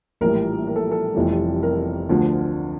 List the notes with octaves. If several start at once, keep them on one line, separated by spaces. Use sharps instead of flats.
A#1 A2 E3 G3 A#4
A#4
A4
A4
F1 F2 E3 G3
A#4
D2 D3 F3